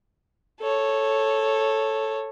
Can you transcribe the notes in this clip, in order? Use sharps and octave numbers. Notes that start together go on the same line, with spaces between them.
A4 C#5